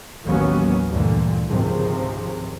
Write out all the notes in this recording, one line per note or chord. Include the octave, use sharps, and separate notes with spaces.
A1 D#2 F#3 B3 C#4
D2 G2 A#2 D3 E3
G#1 C#2 C3 F3